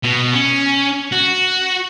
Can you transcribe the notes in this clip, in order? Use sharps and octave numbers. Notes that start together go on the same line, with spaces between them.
B2
C#4
F#4